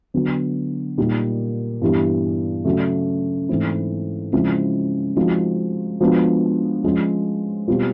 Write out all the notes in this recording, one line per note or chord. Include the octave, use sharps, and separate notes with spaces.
D3 F#3 B3
A#2 G3 A#3 D#4 G4
G2 E3 G3 B3
C#3 F#3 A3
G#2 E3 A3 C4 E4
C#3 F3 G#3 C4 E4
F3 G#3 C4 D#4 F#4
F3 G#3 B3 D4 F#4
F3 G#3 C#4
B2 G3 C4 F4